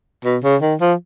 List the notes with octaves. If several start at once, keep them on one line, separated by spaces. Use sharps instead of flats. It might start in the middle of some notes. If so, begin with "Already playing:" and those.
B2
C#3
D#3
F3